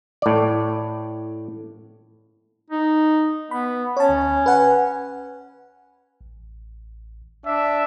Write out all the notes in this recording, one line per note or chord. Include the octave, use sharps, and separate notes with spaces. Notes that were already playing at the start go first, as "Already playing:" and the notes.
A2 D5
D#4
B3 B5
C#4 C#5 A5
D2
B4 F#5 G#5
A1
D4 E5